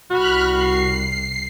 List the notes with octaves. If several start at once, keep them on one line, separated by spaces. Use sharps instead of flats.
C2 F#4 B5 F6 F#6
C7